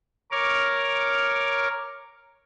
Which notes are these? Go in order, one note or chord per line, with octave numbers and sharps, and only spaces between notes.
A#4 C#5 D6 F6